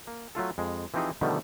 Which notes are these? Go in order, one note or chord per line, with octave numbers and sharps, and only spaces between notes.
A#3
F#3 A3 F4 A4
F2 G#3
E3 F3 C4 D#4 G4 G#4
B2 D3 D#3 F3 G3 A3